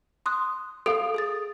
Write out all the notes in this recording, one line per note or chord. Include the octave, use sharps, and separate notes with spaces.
C6 D#6 F#6
A4 F5 D#6 F7
G#4 D#6 A6